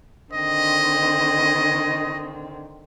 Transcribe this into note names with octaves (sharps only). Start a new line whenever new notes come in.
D3 D#3 C4 D#5